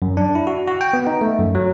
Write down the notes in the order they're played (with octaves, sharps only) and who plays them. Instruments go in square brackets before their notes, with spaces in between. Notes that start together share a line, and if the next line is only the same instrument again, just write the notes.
[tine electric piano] F#2
D4
E4
F#4
F#4
G5
B3
D#4
A3
F#2
F#3